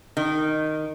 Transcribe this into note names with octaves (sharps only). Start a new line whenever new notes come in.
D#3